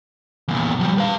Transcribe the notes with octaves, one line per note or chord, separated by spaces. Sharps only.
E2 A#2
F3 G3
B4 F5